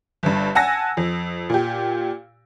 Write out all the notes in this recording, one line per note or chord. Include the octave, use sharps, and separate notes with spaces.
G1 G2
F#5 G#5 A5 E6 A#6
F2
A#2 G4